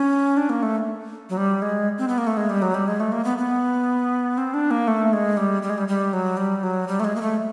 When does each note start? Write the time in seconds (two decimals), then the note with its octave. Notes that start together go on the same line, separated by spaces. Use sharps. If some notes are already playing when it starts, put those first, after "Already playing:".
Already playing: C#4
0.37 D4
0.49 A#3
0.63 A3
1.30 F#3
1.37 G3
1.62 G#3
1.98 C4
2.08 B3
2.18 A#3
2.27 A3
2.37 G#3
2.50 G3
2.62 F#3
2.74 G3
2.88 G#3
3.00 A3
3.12 A#3
3.24 B3
3.38 B3
4.38 C4
4.54 D4
4.71 A#3
4.88 A3
5.13 G#3
5.37 G3
5.62 G3
5.70 G#3
5.78 G3
5.88 G3
6.13 F#3
6.37 G3
6.63 F#3
6.88 G3
7.00 A3
7.04 G#3
7.16 A#3
7.21 A3